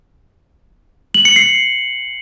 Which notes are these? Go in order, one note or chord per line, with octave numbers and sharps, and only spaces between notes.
F#7
C#7
C7